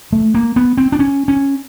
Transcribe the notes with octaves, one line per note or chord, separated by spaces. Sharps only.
A3
A#3
B3
C4
D4
C#4
C#4